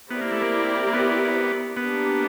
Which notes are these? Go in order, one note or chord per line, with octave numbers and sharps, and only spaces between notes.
B3 C4 E4 G4 A#4 D5
A#3
A3
A#3
A#3
B3
A#3 B3 D4 G4